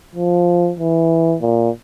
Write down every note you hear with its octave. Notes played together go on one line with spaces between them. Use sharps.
F3
E3
A#2